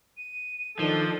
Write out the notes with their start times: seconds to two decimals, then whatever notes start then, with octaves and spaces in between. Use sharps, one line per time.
0.17 D#7
0.79 D#3 F3 D4 A4 G7